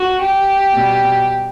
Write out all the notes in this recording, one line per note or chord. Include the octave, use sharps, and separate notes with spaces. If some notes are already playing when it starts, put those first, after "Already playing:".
Already playing: F#4
G4
B2 G3